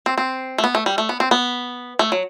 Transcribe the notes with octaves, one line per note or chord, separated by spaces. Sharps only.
C4
C4
A3
B3
A3
G3
A3
B3
C4
B3
A3
F#3